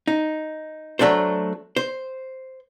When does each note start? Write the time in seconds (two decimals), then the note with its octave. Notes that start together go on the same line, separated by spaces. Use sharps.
0.08 D#4
0.99 F#3 A3 D4 A4 C5
1.76 C5